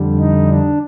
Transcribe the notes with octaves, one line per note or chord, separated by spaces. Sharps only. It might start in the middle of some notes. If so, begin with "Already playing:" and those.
Already playing: F2 D3 G3
D#4
D4